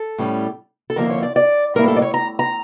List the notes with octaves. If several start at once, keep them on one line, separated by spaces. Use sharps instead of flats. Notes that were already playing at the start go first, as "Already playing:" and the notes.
Already playing: A4
A2 G3 C#4
A4
F2 D3 F3 A#3 E4 A#4
C#5
D5
D5
A2 G3 A#3 E4 A#4
A4
D5
C#5
A#5
A#5